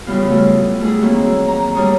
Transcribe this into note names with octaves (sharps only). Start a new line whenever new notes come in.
C#3 E3 F#3 G3 B3 F4
F#3 G3 A3 F4
G3 A3 E4 G#4
D#3 F#3 A#3 C4 F#4
A#5
D2 G3 C#5 D#6